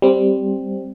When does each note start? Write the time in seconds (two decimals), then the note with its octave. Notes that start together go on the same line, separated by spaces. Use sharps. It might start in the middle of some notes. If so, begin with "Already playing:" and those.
0.02 G3 C4